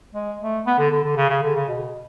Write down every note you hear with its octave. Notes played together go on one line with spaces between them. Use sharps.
G#3
A3
B3
D3
D3
D3
C#3
C#3
D3
C#3
B2